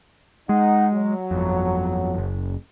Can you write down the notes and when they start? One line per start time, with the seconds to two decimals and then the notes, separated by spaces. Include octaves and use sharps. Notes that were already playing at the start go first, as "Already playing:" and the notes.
0.49 G#3 D#4 F#5
0.94 F#3
1.31 G1 F2
2.18 F#1